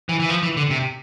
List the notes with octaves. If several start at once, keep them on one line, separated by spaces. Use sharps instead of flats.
E3
E3
F3
E3
D3
C3